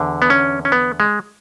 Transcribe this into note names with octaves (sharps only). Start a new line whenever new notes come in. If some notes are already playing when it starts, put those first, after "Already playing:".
Already playing: E2 D3
B3
C#4
C#4
B3
G#3